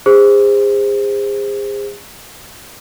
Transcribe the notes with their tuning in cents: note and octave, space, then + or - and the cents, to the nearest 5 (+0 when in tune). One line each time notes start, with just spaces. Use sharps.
G#4 -35 C5 -5